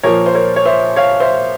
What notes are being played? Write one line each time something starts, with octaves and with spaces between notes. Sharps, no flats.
A#2 F3 A#4 C#5
C5
A#4 C#5
C#5
C5 E5
C#5 F5
C5 E5